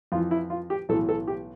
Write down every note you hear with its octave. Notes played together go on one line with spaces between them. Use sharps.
F2 E3 F4
E4
F4
G4
B1 A2 E3 A4
A4
G4